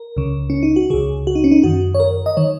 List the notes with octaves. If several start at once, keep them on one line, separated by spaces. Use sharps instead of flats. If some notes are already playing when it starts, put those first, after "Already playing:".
Already playing: A#4
C#2 C#3
C#4
D#4
F#4
C#2 C#3 G#4
F#4
D#4
C#4
D#4
F#2 D#3 F#4
C#5
A#4
D#5
D#3 C#5